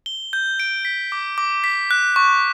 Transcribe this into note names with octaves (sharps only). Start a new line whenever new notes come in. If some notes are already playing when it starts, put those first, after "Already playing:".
G7
G6
D7
B6
D6
D6
B6
F#6
C#6